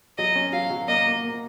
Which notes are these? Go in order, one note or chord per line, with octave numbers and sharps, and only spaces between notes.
F#3 D#5
C#4
F#3 F5
F#3
A#3 D#5
A#3
A#3